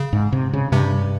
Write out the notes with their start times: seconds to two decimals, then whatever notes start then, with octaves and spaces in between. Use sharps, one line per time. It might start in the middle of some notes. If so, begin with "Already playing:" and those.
Already playing: C#3
0.13 G#2
0.32 C3
0.53 C#3
0.72 G2 C3